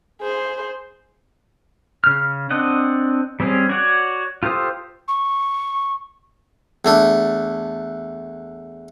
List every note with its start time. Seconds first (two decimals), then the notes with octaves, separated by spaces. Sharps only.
0.21 G#4 C5
2.04 C#3 F6
2.50 C4 D4 D#5 F#5
3.40 G3 C4 C#4 G#4
3.69 F#4 C#5 D5 F#5
4.43 F4 G4 A4 C5 D#6
5.08 C#6
6.85 E2 A3 D4